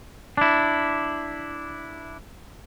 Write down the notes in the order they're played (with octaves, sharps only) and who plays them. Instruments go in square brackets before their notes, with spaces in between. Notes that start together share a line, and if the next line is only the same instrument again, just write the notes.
[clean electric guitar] D4 E4